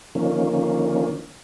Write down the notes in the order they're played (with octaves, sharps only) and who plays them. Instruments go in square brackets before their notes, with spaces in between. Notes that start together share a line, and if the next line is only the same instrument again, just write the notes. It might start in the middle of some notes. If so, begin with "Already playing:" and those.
[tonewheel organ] D3 D#3 F3 A#3 C#4